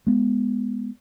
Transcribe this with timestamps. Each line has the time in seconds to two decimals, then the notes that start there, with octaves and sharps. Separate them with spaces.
0.07 G#3 B3